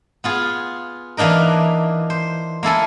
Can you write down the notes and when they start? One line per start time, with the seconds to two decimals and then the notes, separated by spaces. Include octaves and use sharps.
0.24 B3 F4 G#4
1.17 E3 A#3 D4 D#4 A#4
2.10 C5
2.63 A#3 E4 A4 G#5